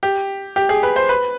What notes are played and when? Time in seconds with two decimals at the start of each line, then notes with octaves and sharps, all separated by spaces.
0.03 G4
0.56 G4
0.69 G#4
0.83 B4
0.96 C5
1.09 B4